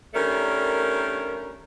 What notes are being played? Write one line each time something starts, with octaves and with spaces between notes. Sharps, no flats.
D#3 G3 A3 C#4 D4 A#4